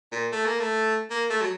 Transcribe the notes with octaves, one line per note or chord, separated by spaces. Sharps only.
A#2
A3
A#3
A3
A#3
A3
F#3